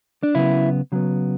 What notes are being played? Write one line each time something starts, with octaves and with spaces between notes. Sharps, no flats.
D4
C#3 F#3 B3 E4
C#3 F#3 B3